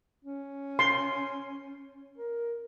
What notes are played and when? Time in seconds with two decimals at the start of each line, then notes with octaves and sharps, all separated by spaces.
0.24 C#4
0.79 C6
2.17 A#4